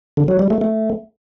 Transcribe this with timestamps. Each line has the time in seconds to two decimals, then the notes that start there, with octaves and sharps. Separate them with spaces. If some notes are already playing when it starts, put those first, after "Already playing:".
0.17 D3
0.28 F#3
0.39 G3
0.50 A3
0.61 A3